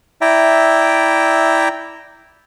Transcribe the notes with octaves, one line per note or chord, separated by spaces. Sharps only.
E4 D5 E5 G5 A#5